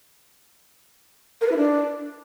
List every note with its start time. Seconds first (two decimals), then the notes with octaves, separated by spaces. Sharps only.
1.41 A#4
1.46 B4
1.51 E4
1.56 D4